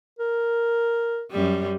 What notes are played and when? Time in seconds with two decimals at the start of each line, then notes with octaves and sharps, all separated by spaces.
0.19 A#4
1.31 F#2 G3